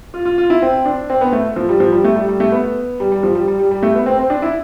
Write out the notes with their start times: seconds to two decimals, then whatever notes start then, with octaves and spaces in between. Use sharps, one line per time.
0.14 F4
0.25 F4
0.38 F4
0.50 E4
0.62 C4
0.86 D4
1.10 C4
1.21 B3
1.33 A3
1.56 F3
1.69 G3
1.80 F3
1.92 G3
2.04 A3
2.16 G3
2.29 G3
2.40 A3
2.52 B3
3.00 G3
3.12 G3
3.23 F3
3.35 G3
3.48 G3
3.59 G3
3.71 G3
3.83 A3
3.95 B3
4.06 C4
4.19 C4
4.30 D4
4.42 E4